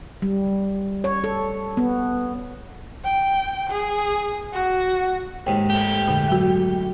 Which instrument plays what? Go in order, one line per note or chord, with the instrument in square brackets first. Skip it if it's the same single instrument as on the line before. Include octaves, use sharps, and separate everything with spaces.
[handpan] G3
C#5
A4
B3
[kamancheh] G5
G#4
F#4
[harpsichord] D#2 G#2 [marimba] G5
[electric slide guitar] A3 G4
[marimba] F2 A#2 D3
F#3 F#4